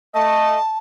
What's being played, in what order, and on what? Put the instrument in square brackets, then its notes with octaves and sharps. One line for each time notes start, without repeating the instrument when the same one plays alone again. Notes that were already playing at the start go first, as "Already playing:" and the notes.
[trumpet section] A3 D#5 [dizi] A5